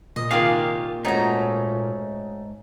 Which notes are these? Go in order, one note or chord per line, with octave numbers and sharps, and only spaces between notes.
A#2 D#5
C3 D#3 A#3 F4 G4 G#4 F5
G#2 A3 C#4 D#4 F#4 A#5